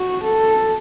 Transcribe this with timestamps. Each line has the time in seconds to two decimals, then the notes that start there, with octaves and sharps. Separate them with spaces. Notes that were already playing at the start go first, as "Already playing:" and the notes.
Already playing: F#4
0.24 A4